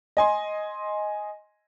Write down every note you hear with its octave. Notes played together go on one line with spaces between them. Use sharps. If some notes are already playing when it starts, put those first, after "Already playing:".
D#5 G#5 C6